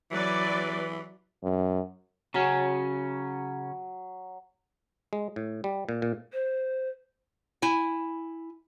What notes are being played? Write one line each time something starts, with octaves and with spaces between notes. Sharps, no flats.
E3 F#3 B4 D5
F#2
C#3 F#3 C#4
G#3
A2
G3
A#2
A#2
C5
E4 G#5